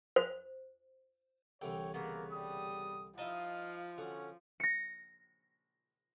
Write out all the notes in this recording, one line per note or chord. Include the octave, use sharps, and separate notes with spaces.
C5
C2 D3 E3 C#5 G5
C#3 A#3 B3
G3 D#6
F3 D#4 E4 D#5 F5 A5
D3 C#4 F#4
A#6 C#7